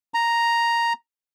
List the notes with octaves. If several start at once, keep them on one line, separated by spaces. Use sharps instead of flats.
A#5